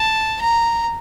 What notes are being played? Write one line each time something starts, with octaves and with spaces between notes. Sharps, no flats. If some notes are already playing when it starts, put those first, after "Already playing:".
Already playing: A5
A#5